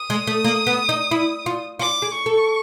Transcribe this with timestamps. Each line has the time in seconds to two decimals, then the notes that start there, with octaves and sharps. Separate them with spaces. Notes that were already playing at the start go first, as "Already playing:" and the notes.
Already playing: D#6
0.10 G#3
0.27 A3
0.44 A#3
0.67 B3
0.89 D#4
1.11 E4
1.46 F4
1.79 F4 D6
2.02 G#4
2.14 C#6
2.26 A4